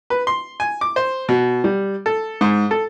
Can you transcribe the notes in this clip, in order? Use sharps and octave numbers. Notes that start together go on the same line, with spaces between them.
B4
C6
G#5
D6
C5
B2
G3
A4
G#2
A4